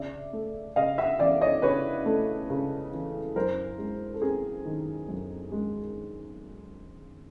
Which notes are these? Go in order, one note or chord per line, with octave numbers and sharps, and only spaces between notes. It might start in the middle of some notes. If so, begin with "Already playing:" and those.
Already playing: C#3 D5 E5
A3
C#3 D#5 F5
E5 F#5
E3 D5 E5
C#5 D#5
C#3 B4 C#5
A3
C#3
E3
F#2 A#4 C5
G#3
A4
C4 G#4 A#4
D#3
F#2
G#3